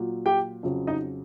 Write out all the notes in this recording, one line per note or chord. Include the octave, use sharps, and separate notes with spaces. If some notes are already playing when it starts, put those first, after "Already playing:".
Already playing: A#2 F#3
G4 G5
F2 C#3 F#3
D#4 D#5